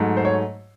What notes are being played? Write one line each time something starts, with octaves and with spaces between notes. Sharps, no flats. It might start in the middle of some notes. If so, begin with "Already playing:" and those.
Already playing: G#2 F#3 A3
C5
C#5